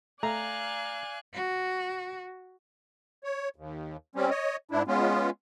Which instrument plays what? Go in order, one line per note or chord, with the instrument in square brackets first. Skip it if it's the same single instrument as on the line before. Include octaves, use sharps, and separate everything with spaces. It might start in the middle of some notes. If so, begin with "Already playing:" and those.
[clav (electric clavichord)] A3 [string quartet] D5 G#5 F#6 [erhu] F5 [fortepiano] A#5
[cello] F#4
[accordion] C#5
D#2
G3 C4 C#4
C#5 D#5
G#2 D4 E4
G#3 B3 C#4 F4